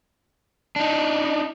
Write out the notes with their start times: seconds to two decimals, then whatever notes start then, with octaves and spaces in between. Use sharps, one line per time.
0.76 D4 D#4